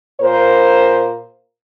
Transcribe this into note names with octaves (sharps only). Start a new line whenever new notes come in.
A#2 A#4 C5